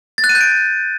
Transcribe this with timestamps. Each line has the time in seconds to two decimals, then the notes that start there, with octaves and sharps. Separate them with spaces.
0.18 A6
0.24 F#6
0.29 D#7
0.35 G6
0.41 D7